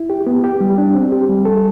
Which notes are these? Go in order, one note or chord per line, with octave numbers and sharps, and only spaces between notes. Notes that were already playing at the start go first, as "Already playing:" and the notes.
Already playing: E4
G4
B3
G4
G3
D4
C4
G4
G3
A4